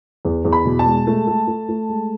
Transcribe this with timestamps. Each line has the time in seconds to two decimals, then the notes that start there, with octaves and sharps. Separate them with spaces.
0.25 E2
0.45 E2
0.52 B5
0.65 B2
0.79 A5
0.86 G#3
1.07 A3
1.27 A3
1.47 A3
1.69 A3
1.89 G#3